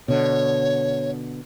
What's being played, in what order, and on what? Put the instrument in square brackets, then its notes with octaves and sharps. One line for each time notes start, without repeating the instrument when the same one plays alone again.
[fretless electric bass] B2 D3 [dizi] C#5